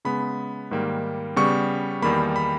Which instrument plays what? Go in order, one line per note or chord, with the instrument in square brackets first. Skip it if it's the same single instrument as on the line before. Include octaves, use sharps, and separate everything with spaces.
[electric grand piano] C#3 G#3 B3 B5
G#2 D#3 G3 A#3
C#3 G3 B3 C#6
E2 D#3 G3 A#3 B5
B5